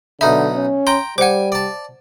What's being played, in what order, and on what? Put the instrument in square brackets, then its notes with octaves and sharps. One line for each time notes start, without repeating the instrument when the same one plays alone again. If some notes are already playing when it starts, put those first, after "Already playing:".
[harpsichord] B1 D#4 B5 [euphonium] D3 [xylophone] E5
[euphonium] C#4
[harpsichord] G5 A#5 [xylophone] C6
[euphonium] G3 [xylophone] C5 F#5 [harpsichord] G#5 D6
[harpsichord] D5 A5